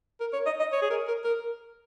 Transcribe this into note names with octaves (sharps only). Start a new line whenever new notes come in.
A#4
C#5
D#5
D#5
C#5
G#4
A#4
A#4
A#4